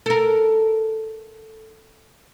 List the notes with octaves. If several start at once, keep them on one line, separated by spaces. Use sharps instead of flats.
A4 A#4